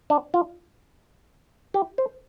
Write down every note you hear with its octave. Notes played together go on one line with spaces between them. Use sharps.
D4
F4
G4
C5